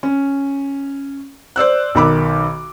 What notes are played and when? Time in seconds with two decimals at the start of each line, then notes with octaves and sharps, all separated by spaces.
0.03 C#4
1.56 C5 D5 E6 F#6
1.95 B1 D#3 B5 D6